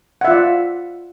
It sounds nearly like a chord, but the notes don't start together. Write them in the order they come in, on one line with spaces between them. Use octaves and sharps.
F#5 E5 F4 D5